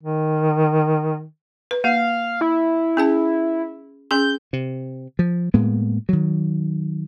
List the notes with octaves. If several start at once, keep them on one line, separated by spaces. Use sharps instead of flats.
D#3
B4
A#3 F5
E4
C#4 G#4 A5
C#4 G#4 C6 G6
C3
F3
A2 G#3 A#3 B3
D#3 F#3